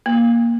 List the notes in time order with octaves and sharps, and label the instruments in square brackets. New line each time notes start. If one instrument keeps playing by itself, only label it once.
[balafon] A#3